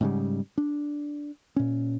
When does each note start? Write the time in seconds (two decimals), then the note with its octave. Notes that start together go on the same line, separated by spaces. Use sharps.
0.01 G#2 C#3 G3
0.58 D4
1.56 A#2 C#4